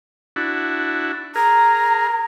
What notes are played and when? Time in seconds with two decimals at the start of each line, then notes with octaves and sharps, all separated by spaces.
0.36 D4 E4 F#4
1.36 G#4 A#4 A#5